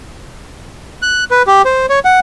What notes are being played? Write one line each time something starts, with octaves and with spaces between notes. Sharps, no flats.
F#6
B4
G4
C5
C#5
F#5